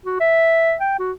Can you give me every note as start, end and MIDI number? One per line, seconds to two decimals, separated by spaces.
0.06 0.16 66
0.20 0.75 76
0.80 0.97 79
0.99 1.12 66